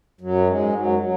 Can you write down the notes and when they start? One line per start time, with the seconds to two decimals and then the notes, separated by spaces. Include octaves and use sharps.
0.21 F#2 F#3
0.46 G#2 G#3
0.73 F#2 F#3
0.99 F#3